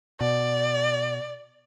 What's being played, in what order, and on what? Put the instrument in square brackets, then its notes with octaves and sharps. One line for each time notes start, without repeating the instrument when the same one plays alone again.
[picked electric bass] B2 [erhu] D5